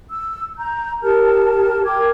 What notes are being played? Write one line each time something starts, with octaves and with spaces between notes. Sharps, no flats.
E6
A#5 G6
G4 A#4 A5 F6
A#4 G5 D6 G#6